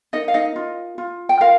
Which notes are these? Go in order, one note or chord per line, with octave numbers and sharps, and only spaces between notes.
D#4 A#4 D#5
F5
D#4 D#5
F4
F4
G5
F4 A#4 F5